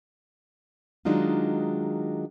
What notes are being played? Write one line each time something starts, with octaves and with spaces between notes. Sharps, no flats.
D#3 F#3 G#3 D4 D#4 F4